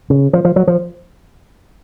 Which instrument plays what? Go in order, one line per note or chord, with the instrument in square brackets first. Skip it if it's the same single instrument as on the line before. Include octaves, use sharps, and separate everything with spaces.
[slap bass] C#3
F3
F3
F#3
F3